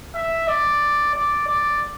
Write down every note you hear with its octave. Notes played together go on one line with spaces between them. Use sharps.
E5
D5
D5
D5